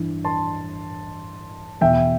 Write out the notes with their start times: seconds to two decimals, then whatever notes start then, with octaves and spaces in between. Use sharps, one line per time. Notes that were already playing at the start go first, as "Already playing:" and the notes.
Already playing: G2 E3
0.25 A5 C6
1.81 E2 B2 E5 G5